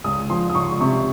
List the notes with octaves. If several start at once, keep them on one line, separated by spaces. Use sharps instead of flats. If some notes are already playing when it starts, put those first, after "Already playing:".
C#2 D#6
F3 C6
D#6
C#2 C#6
C3 C#6